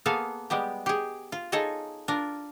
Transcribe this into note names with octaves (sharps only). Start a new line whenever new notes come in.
A#3 B3 G#4 A4 F5
G3 G#3 B3 G4
G4 G#4
F4
D#4 F4 G#4 A4 C#5 D#5
D4 F4 A#4